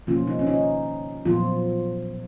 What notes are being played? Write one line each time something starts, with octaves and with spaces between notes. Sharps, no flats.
B2 F3 A#3 C#4 F4
D#4
C#4
D#4
A#2 F3 F#3 B3 F4